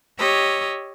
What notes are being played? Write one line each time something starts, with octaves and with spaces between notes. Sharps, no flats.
G4 C#5 D#5 E6